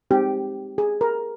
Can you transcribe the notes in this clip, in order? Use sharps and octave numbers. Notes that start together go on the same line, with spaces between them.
G#3 C4 D#4 G4
G#4
A#4